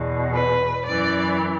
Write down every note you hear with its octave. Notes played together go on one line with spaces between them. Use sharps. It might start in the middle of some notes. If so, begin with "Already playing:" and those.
Already playing: E2 B2
B4
F#2 E3 D5